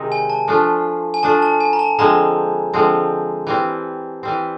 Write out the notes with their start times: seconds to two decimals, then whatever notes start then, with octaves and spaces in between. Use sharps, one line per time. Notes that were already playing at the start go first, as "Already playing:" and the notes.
Already playing: C3 D#3 G#3 C4 D#4
0.12 G#5
0.30 A5
0.48 F3 A3 D4 F4
1.14 G#5
1.23 F3 A3 D4 F4 A5
1.42 A5
1.61 G#5
1.73 A#5
1.79 A5
1.99 D3 F3 G#3 C4 A#5
2.73 D3 F3 G#3 C4
3.47 E3 G3 C4
4.23 E3 G3 C4